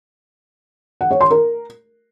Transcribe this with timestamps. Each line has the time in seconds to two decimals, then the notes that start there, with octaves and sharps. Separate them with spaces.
1.01 F#5
1.11 C#5
1.21 C6
1.31 A#4